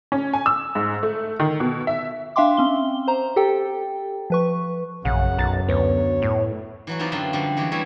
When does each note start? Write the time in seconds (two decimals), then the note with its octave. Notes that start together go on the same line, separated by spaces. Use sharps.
0.12 C#4
0.33 G#5
0.46 E6
0.75 G#2
1.03 A3
1.40 D#3
1.60 B2
1.87 E5
2.36 D4 E5 F5 G5 C6 D6
2.57 C4 C#4 G7
3.07 C5 A#5
3.36 G4 A4 G5
4.30 F3 B4 C#6
5.05 A#1 F#2 C#3 F#5
5.38 B1 A#5 A6
5.69 D2 B3 C#5
6.22 A2
6.87 E3 F#3 F#4
6.99 B3 C4 D#4 F4 G4 B4
7.12 F#2 D3 F4 E5 G5
7.33 D3 F3 G3 C4
7.57 E3 G#3 F#4 G4
7.71 G3 A3 E4 C#5 E5